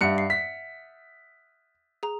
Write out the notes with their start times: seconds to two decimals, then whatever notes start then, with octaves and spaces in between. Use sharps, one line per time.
0.01 G2 E5 F#5 F#6 C#7
0.18 C7
0.30 B6
2.03 G#4 A#5